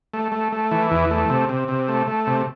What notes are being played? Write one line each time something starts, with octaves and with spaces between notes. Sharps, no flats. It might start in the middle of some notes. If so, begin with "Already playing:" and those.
A3
A3
A3
E3
E2
A3
C3
C3
C3
A3
A3
C3